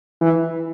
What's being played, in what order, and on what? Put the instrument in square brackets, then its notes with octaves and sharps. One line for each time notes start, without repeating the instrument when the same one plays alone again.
[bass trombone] E3